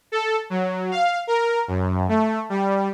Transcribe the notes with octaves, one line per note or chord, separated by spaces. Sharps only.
A4
F#3
F5
A#4
F#2
A3
G3